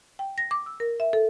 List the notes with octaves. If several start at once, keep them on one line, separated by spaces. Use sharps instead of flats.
G5
A#6
D6
E6
A#4
E5
A4